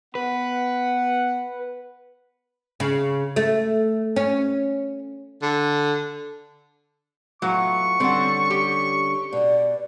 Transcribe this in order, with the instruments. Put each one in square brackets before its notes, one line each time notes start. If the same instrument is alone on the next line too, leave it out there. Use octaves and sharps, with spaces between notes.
[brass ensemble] B3 F#5 [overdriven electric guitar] B4
[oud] C#3
A3
C#4
[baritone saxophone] D3
[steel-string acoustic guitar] A2 B3 F4 [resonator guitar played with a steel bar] F#3 [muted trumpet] C#6
[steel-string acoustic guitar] D3 G3 C#4 [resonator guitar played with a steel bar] C4 A4 F#5
[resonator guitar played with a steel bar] G4
[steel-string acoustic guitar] B2 F#4 [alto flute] D5